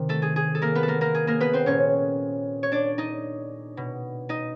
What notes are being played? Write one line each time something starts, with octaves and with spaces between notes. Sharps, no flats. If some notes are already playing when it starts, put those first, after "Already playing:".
Already playing: C3 D#3
A3 A4
G#4
G#4
A4
A#3 A#4
B3 B4
A4
A#3 A#4
A#3 A#4
G#4
A#3 A#4
B3 B4
C4 C5
A#2 C#4 C#5
C#5
D4 D5
D#4 D#5
B2
D#4 D#5